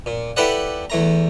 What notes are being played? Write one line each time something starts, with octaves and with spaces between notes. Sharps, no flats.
A#2
E4 G4 A4 B4 D5 F#5
E2 A3 A#5